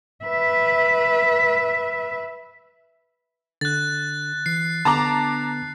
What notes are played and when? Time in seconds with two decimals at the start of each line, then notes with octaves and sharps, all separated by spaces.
0.25 B4 E5
3.61 D3 F#6 A6
4.46 E3 C7
4.85 D3 B3 D4 A5 A#5 D6